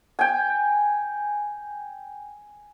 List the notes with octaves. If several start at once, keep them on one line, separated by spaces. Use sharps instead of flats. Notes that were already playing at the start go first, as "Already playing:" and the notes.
G5 G#5